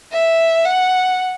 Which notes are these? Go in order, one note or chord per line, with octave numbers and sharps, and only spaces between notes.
E5
F#5